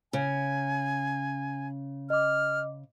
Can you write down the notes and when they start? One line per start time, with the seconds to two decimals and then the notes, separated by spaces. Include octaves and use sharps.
0.13 C#3 G#5
2.10 D#5 D6 F6